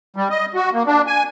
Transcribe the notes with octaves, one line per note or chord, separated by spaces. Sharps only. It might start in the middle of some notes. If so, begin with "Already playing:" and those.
G3
D#5
F#4
A#3
D4
G#5